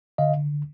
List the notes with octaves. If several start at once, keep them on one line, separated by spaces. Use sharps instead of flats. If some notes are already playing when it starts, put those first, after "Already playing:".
D3 D#5 F5